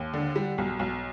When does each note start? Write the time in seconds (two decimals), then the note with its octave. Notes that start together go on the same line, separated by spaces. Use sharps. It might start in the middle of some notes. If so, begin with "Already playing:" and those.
Already playing: D#2
0.14 D3
0.36 G3
0.58 B1
0.79 B1